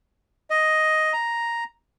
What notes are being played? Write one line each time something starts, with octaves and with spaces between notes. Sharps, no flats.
D#5
A#5